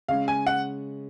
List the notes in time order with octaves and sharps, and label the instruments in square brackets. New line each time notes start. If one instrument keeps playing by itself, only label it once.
[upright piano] C#3 G#3 C#4 [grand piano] F5
[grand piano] G#5
F#5